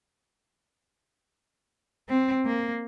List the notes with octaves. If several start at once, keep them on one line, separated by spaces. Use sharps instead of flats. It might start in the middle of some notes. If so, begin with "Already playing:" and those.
C4
A#3